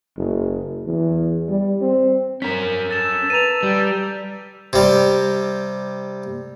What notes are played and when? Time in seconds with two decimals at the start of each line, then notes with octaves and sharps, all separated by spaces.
0.17 F#1
0.86 E2
1.48 G3
1.81 C4
2.42 C#4 A#4 B6
2.91 A4 A6 E7
3.30 B4 A#5 D#7 F7
3.63 G3
4.73 C3 G3